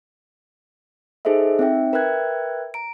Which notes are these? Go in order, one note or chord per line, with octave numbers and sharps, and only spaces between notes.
D#4 G#4 A4 C5 D#5 E5
C4 D#4 E5 G5
A#4 B4 E5 G5 F#6 G#6
A#5 D7